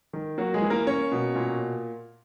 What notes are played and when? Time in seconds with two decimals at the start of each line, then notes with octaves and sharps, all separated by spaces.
0.13 D#3
0.38 F#3 A#3 F#4
0.54 G#3 G#4
0.62 E3
0.70 A#3 A#4
0.87 A#3 C#4 C#5
1.12 B2
1.35 A#2